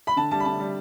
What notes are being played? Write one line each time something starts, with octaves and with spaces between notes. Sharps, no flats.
B5
D3 A5
G3 A5
B5
D3 A5
G3